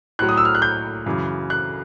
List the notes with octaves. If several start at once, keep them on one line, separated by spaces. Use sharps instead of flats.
A2 F#3 F#6
D#6
E6
F6
F#6
G6
F#2 C#3 E3
F#6